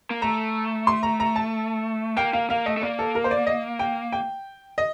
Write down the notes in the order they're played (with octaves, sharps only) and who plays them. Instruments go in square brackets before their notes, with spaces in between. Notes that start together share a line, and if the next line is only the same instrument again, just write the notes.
[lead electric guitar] A#3
[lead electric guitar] A3 [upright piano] A#5
[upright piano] C6
A#5
A#5
A5
[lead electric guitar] A#3 [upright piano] G5
[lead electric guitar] A#3 [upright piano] F5
[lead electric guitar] A#3 [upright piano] F5
[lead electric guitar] A3 [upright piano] D#5
[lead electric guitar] A3
[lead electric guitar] A#3 [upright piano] D5
[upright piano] A4
A#4
C5
D5
D#5
G5
G5
D#5